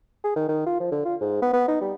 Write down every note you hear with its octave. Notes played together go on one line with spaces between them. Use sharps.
G#4
D#3
D#3
F4
F3
D3
F4
G#2
B3
B3
D#4
G3